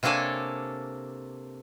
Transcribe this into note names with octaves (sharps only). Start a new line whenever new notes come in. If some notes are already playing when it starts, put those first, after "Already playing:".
C3 A#3 D4 A4 C#5 G#5